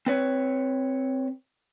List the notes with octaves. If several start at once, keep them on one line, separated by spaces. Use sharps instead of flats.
C4 B4 C#5